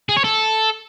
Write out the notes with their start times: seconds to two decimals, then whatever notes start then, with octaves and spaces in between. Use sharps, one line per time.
0.09 G#4
0.17 C#5
0.24 A4